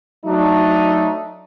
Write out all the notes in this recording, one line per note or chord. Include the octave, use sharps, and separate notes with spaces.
F#3 A3 D4 D#4